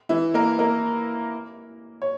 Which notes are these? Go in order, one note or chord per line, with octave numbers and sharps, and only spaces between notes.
E3 E4
A#3 A#4
A#3 A#4
C#5